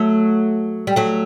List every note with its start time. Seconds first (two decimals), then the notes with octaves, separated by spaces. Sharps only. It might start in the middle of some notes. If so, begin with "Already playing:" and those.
Already playing: F#3 A3
0.87 G3
0.96 F#3 A3